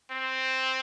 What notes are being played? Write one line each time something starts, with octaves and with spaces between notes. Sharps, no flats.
C4